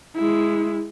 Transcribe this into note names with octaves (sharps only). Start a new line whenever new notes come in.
G#3 E4